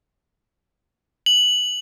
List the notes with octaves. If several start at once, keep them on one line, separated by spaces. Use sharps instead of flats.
F#7